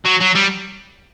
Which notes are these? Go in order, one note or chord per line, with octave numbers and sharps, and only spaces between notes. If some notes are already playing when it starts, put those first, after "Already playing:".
F#3
F#3
G3